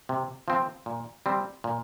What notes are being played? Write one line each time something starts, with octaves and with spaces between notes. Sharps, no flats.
C3
F3 C4
A#2
G3 C4
A#2